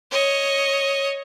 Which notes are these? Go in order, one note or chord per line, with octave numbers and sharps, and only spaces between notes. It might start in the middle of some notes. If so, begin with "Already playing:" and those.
C#5 D#5